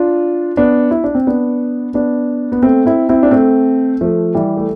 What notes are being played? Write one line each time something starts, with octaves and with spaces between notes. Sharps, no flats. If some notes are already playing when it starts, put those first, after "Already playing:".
Already playing: D4 F4
B3 D4
E4
D4
C4
B3 D4
B3 D4
B3
A3 C4
C4 E4
C4 E4
D4
A3 C4
F3 A3
E3 G3
A3